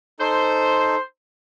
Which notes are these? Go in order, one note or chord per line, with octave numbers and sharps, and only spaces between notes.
D#4 A4 C5